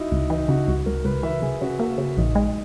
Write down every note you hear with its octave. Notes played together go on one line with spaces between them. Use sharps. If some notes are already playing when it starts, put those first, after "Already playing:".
Already playing: D#4 E4 F#4
C#2
E3 D#4
C#3 F#4
C#2 F#4
C#2 A#4
C#2 B4
E3 E5
C#2 G#4
C#3 F#4
A#3 F#4
C#3 F#4
A#1 D#4
G#3